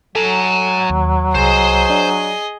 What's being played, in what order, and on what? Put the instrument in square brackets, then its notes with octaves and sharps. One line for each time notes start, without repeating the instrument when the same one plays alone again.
[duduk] F#3 [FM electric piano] A4 [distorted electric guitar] G#5 A#5
[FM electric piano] D#2
[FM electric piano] C2 [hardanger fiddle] G#4 D#5 [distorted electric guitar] C5
[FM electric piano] D4